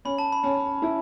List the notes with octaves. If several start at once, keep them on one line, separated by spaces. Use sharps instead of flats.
C#4 B5
A5
B5
C#4
E4